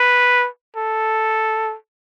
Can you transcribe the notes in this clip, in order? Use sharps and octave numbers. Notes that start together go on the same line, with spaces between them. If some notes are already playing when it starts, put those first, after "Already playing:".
Already playing: B4
A4